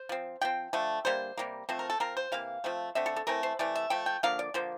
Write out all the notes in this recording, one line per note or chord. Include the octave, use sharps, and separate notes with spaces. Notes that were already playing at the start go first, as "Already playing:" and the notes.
Already playing: C5
F3 C4
F3 C4 G5
D3 F3 A3
D3 G3 A#3 C5
C3 G3 A#3
F3 A3 C4 C5
A#4
A4
F3 C4 A#4
C5
C3 E3 A#3 F5
F3 A3 C4
D3 A3 C4 E5
A4
A4
E3 A3 C4 A#4
C5
C3 E3 A3 D5
E5
F3 A3 G5
G5
D3 F3 A#3 F5
D5
D3 F3 A#3 C5